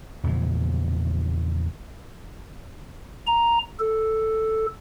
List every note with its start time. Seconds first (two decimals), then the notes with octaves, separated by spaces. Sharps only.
0.24 E2 A#2 C#3 F3
3.27 A#5
3.80 A4